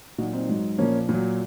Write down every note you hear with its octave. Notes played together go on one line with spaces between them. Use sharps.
A#2 F#3 D#4 F#4
C4 D#4
G#2 F#3
A#2 F3 A#3 C#4
A#2 F#3